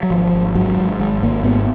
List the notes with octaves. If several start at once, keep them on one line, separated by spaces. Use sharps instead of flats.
F#3
G#1 F3
G#1
G#2 F#3
G#2
G#1 G#3
G#1 A#3
G#2 B3